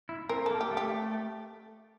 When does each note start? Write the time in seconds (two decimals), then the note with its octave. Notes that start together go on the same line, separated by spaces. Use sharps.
0.09 E4
0.29 C4 A#4
0.46 A#3 A4
0.61 G4
0.71 A3
0.77 G4